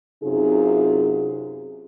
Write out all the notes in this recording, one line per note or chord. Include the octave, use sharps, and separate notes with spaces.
F#2 C3 D#4 F4 G#4